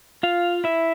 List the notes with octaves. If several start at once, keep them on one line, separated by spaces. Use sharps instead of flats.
F4 F5
E4 E5